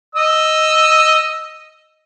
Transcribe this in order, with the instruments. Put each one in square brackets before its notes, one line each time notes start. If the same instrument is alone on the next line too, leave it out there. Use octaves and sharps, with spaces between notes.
[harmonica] D#5 E6